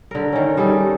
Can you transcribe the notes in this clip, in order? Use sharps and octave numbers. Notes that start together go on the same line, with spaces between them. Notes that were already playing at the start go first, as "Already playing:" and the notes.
D3 A#4
D#3 C#4
G3 D#4 G#4 A4